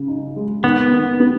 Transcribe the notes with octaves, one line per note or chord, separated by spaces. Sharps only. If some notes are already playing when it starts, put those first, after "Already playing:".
Already playing: C#3
D#4
G#3
D#3 B3
D#3
B3